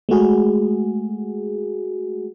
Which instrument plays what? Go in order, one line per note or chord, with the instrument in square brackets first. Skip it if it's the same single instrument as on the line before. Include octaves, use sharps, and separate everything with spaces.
[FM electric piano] G#3 A3 F#4 G#4